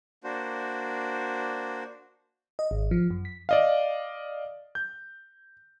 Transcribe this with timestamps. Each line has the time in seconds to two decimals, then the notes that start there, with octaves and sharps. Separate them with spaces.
0.24 A#3 D4 F#4 C5
2.59 D#5
2.71 G#1
2.91 F3
3.11 F#2
3.25 B6
3.49 D5 D#5 F5
4.75 G6